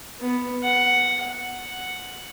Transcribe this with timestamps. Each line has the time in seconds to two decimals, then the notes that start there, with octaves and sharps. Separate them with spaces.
0.20 B3
0.63 F#5
1.24 F#5